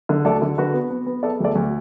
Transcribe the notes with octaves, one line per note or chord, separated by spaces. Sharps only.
D3
D2 A4 D5
D3
D3 F#4 B4
B3
B3
B3
B3 A4 D5
D2 A4 D5
D2